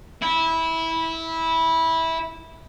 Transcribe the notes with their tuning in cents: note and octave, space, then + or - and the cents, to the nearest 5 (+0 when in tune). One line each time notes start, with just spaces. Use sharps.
E4 -15